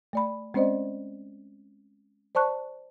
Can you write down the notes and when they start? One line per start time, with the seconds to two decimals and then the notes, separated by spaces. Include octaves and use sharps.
0.13 A3 D5 B5
0.54 G#3 C4 C#4 C5 D5 D#5
2.35 C5 D5 A5 C#6 F#6